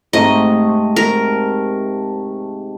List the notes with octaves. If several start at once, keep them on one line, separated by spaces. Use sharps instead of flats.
G#2 C3 A3 D#5
A#4